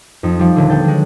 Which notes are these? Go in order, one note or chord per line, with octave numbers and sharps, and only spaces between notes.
F2 D#4
F3 G3
D#1 D3 D5
B3 D4 G5 A6
F#3 G#3